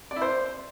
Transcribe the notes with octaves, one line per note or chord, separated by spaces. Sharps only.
D5
E4
C5